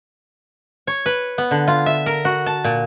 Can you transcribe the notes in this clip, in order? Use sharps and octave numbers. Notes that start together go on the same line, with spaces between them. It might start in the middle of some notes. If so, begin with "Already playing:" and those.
C#5
B4
B3
D3
F4
E5
A#4
F#4
A5
A#2